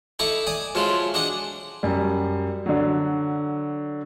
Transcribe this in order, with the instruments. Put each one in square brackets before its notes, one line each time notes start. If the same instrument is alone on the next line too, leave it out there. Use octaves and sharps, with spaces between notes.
[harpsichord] D#4 E4 A4 A#5 C#6 D6
D5 G#5 D6 D#6
F3 F#3 G#3 E4 F4
D4 G#4 D#5 F#5
[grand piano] F#2 G3
D3 F#3